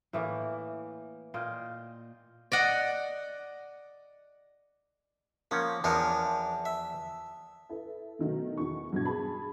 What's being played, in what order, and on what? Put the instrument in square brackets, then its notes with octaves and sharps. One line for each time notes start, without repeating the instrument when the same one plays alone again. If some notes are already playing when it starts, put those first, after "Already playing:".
[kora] A2 E3 A#3
A#2 F4 D#5 G5
[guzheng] D5 D#5 F#5
[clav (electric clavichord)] F3 C#4 F#5 [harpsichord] A#3
[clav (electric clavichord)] E2 F3 [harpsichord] D4 A#4 C#5 [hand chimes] A5 D#6
[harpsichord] E5
[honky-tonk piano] E4 A4 B4 E5
B2 D#3 F#3 A3
E2 D#3 C#6
G2 B2 F#4 G#6
G#4 A5 B5